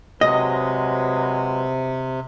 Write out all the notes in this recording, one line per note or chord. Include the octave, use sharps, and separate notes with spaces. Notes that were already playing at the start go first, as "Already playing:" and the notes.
C3 F#3 G#3 B4 D#5